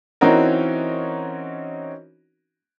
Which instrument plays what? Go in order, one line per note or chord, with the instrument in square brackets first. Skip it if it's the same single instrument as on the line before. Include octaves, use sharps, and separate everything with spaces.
[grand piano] E3 C4 C#4 D#4 F#4 A#4